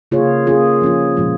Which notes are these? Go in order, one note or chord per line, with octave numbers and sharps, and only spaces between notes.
C#3 A#3 F4 G#4 C#5
A#3 C#4 F4 G#4
F3 C#4 F4
A#2 F3 G#3 F4